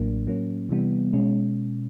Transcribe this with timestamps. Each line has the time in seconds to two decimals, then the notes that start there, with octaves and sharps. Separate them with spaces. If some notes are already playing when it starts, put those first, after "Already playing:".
Already playing: A1 A2 F#3 A#3 D4
0.26 A2 F#3 A#3 C#4
0.69 C3 E3 G3 B3
1.13 B2 G#3 C#4